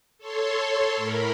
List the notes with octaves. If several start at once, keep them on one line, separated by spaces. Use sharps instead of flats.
A4 C#5 C6
A2 A#4 B5